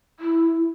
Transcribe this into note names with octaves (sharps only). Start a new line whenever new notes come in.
E4